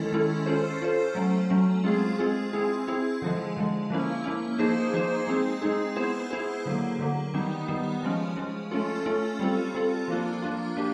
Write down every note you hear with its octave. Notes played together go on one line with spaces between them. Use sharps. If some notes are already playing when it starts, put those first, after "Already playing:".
Already playing: D#3 G#3 C#4 E4 A4
D#3 G#3 C#4 E4 A4
C#4 F4 A4 C5
C#4 F4 A4 C5
F#3 A3 C#4
F#3 A3 C#4
G#3 C4 F4 G#4
G#3 C4 F4 G#4
C4 E4 G#4
C4 E4 G#4
D3 F3 G#3
D3 F3 G#3
F3 A#3 C#4 E4
F3 A#3 C#4 E4
F3 A#3 D#4 G#4 C5
F3 A#3 D#4 G#4 C5
G#3 C4 D#4 G#4
G#3 C4 D#4 G#4
B3 E4 G#4 C5
B3 E4 G#4 C5
D3 F#3 A#3
D3 F#3 A#3
D#3 G3 B3 D#4
D#3 G3 B3 D#4
F3 G#3 C#4
F3 G#3 C#4
A3 C#4 F4 A4
A3 C#4 F4 A4
G3 C4 F4 A4
G3 C4 F4 A4
F3 A#3 D4 F4
F3 A#3 D4 F4
A#3 D4 G4